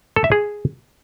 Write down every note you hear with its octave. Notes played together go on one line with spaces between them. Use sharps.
A4
E5
G#4